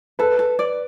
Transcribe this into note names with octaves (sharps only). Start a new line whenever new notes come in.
A4 B4
A4
D5